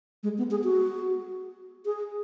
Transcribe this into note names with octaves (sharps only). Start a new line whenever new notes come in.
G#3
B3
G#4
F#4
G#4